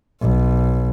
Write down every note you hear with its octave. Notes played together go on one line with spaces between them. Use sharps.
B1